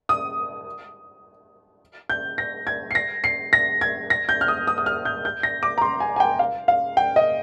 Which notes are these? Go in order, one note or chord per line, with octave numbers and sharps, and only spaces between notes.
D#6
G6
A#6
G#6
C7
A#6
C7
A#6
G#6
A#6
G6
F6
D#6
D#6
D#6
F6
G6
G6
A#6
D6
A#5
C6
G#5
G#5
G5
F5
F5
G5
D#5